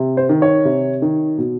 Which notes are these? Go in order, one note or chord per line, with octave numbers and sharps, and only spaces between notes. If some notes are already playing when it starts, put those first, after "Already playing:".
Already playing: C3
C5
D#3
C#5
C3
D#3
B2